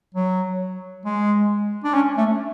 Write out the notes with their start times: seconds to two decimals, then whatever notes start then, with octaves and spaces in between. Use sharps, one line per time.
0.14 F#3
1.05 G#3
1.84 D4
1.94 C#4
2.17 A3